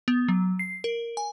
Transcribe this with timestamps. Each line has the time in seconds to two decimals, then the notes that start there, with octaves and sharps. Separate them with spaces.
0.08 B3
0.28 F#3
0.59 C7
0.84 A#4
1.17 G#5